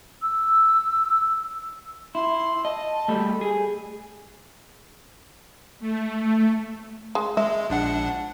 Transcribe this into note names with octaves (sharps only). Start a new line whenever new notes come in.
E6
E4 C6
D#5 A5
G3 A3 B5
G#4
A3
G#3
G#3 E5
A#1 D4 F#5